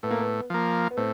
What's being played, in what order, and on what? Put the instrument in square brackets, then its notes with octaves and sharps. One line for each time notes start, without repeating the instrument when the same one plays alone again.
[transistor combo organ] A2 [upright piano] B3
[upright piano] A#3
B3
[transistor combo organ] F3 A#3
[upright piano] B3
[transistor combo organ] A2 [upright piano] C4